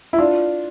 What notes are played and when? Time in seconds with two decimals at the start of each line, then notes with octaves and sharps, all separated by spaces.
0.13 E4
0.18 D4 F4